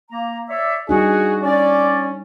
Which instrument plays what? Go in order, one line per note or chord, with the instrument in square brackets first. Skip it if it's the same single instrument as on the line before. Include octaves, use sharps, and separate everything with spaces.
[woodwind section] A#3 A#5
C#5 D5 E5
[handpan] G3 D4 D#4 [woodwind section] F#4 [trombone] G#4
[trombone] C#4 [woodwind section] D5